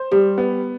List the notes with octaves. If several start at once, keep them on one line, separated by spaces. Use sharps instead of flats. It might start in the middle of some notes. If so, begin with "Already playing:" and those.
Already playing: C5
G3 G4
B3